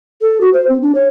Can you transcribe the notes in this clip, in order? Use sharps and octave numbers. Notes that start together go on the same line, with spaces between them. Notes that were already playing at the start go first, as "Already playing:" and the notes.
A4
F#4
C5
C4
D4
C#5